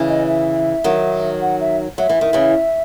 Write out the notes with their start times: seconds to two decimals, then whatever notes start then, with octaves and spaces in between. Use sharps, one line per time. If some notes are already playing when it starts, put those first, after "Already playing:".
Already playing: C#3 E3
0.09 D#5
0.27 E5
0.84 D#3 F#3
1.41 F#5
1.60 E5
1.98 F#3 E5
2.09 E3
2.21 D#3
2.33 C#3 E3